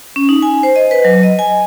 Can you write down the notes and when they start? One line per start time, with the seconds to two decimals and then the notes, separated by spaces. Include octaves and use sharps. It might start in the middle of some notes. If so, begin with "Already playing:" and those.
0.16 C#4
0.29 D#4
0.42 G#5
0.63 C5
0.76 D#5
0.91 B4
1.05 F#3
1.23 D#5
1.39 G#5